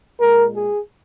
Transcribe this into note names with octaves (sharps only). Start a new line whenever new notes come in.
A#2 G#3 A#4
G#4